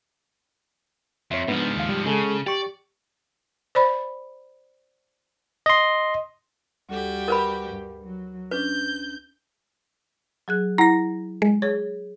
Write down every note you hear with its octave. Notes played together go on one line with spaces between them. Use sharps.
F2 C#5 E5
G#2 F3 B3 D4
D#2 F5
G3
C#3 G#3 G#4 A4
G4 D5 C#6
C5 D5 B5
D#5 C6
D2 G3 F#4 G4 A4
A#4 B4 B5
G2
F#3
C#4 D4 B4 G6
F#3 G#4 F#6
E4 F#5 A#5 A#6
G#3
G#4 C#5